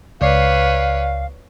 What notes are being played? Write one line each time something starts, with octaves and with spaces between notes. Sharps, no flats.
C#2 B4 C#5 D5 F5 C7